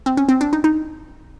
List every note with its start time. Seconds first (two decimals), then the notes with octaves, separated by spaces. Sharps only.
0.06 C4
0.17 C#4
0.29 C4
0.41 D4
0.53 D#4
0.64 D#4